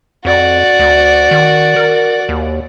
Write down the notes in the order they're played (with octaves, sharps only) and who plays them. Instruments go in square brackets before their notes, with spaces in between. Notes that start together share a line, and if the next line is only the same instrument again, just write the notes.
[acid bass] F2 [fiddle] F#4 D5
[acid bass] D2
D#3
A#4
D#2